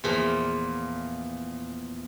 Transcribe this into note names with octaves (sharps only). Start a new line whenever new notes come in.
E2 A#2 F3